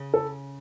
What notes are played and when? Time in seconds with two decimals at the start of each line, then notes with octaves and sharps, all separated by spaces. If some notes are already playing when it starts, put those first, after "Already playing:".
Already playing: C#3
0.14 A4